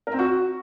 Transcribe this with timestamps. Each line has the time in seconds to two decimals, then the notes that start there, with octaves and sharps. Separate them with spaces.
0.07 A#4
0.13 C4
0.19 F#4